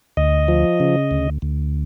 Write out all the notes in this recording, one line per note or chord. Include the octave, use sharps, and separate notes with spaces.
D2 D#5
F3
C#3
D2
D2